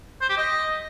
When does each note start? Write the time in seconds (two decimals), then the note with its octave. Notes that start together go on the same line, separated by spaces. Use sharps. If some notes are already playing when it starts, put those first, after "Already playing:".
0.21 C5
0.29 G4
0.38 D#5